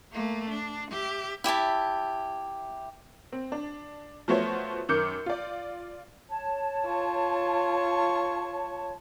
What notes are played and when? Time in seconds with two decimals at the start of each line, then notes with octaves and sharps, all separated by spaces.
0.11 A3 A#3
0.50 D4
0.91 G4 E5
1.44 E4 G4 E5 A5
3.32 C4
3.52 D4
4.28 F3 A3 B3 F#4 C5 C#5
4.89 F#2 D#3 D6 G6 C#7
5.26 F4 D5
6.29 C#5 A5
6.85 F4 C#6